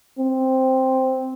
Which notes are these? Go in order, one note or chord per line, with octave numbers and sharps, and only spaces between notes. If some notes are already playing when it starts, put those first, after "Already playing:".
C4